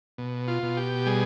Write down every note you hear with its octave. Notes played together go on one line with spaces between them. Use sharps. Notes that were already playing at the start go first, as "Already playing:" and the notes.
B2
F4
B2
G4
G3 G#4